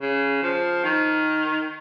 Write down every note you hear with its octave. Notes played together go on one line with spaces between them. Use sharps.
C#3
F3
D#3